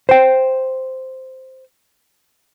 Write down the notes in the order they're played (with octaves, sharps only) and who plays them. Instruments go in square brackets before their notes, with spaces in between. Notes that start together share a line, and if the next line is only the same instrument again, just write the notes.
[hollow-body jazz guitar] C5 G5